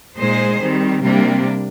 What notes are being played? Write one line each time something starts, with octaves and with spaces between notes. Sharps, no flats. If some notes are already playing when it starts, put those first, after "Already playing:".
A#2 G#3 D#4 G#4 C5
D#3 G3 C4
C3 G3 A#3 D4